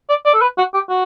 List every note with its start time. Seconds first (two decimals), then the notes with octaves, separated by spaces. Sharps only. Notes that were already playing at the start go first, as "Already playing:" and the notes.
0.09 D5
0.25 D5
0.34 A4
0.42 B4
0.58 F#4
0.74 G4
0.90 F#4